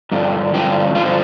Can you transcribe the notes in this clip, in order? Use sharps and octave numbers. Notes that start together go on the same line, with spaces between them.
G2 D3 F3
G2 D3 F3 G4
G2 D3 F3 F4